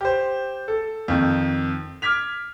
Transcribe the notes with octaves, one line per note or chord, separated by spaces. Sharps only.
G4 C5
A4
F2 D#3
D6 F6 G#6 B6 F7